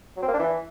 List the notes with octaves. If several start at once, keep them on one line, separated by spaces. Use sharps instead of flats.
F#3
C4
A#3
D4
E3